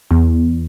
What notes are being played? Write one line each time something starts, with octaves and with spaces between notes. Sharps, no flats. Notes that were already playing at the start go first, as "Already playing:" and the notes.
E2